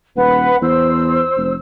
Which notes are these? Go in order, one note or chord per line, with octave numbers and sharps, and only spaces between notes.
D#1 B4 F#5
E2 C5 E6
F1